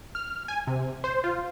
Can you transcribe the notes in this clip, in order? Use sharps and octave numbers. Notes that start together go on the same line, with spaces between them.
F6
G#5
C3
C5
F4